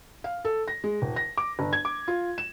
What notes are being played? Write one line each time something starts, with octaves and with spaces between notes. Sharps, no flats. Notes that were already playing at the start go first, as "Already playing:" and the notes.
F5
A4
A#6
G#3
D#1
A#6
D6
G1
G#6
D6
F4
E7